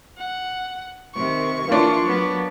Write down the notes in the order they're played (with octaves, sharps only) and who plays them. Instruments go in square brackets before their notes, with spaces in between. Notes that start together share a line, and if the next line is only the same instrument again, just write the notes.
[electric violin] F#5
[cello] C3 D#3 [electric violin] C#6
[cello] E3 F4 [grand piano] A#3 D4
[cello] F#3 B3